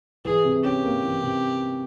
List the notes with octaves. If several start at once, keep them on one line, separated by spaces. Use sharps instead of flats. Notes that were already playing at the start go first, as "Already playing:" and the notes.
E3 G#4
C3
C#4 G4
A#3
E3
C3